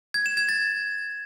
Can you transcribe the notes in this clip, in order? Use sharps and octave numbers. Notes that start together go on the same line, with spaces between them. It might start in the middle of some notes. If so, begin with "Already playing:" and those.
G#6
E7
G#6
A6